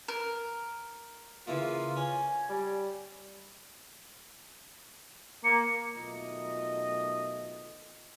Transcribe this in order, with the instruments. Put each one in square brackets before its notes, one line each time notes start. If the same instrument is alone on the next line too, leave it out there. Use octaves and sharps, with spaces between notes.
[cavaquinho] A#4
[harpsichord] C#3 E3 A#3 [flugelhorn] F4
[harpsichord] C#4 [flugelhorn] G#5
[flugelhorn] G3
[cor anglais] A#3 [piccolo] C#7
[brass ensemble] B1 D#3 A3 F4 D#5